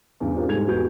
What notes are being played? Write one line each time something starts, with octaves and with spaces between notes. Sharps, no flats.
E2 G2 C#3
C4 D4 F4 G4 A#4
G#2 G3 G#3 A4 G#6 F7
E2 F#4 B4 G6